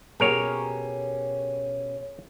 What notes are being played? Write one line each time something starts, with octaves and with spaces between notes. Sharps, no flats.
B2 C#4 G4 G#4 A#4 C#5